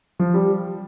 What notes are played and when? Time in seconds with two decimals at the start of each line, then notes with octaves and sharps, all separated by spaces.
0.19 F3
0.34 G3